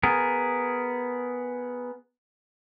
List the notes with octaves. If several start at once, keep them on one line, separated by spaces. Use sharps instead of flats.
B3 G#4 A#4